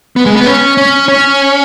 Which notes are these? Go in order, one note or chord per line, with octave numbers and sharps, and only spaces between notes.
B3
G#3
B3
C#4
C#4
C#4